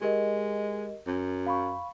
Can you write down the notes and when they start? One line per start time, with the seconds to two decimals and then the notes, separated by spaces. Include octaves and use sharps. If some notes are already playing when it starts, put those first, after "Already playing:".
0.02 G#3 G4 A#4 D#5
1.07 F#2
1.46 F5 B5 C#6